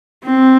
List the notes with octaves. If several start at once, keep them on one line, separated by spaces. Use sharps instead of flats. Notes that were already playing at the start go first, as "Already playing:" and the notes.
C4